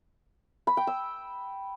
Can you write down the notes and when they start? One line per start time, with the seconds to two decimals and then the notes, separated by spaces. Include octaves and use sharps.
0.67 B5
0.77 G5
0.87 E6